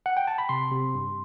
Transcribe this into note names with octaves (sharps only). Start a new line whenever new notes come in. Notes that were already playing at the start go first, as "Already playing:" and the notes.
F#5
G5
A5
B5
C3 C6
C3
G2